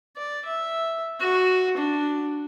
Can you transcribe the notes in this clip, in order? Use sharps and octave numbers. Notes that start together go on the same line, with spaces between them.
D5
E5
F#4
D4